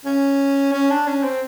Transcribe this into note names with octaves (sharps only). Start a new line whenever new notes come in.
C#4
C#4
D4
C#4
C4